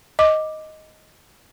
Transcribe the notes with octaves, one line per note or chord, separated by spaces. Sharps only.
D#5 D6